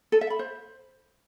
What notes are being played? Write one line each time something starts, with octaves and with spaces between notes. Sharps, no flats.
A4
E5
B5
C5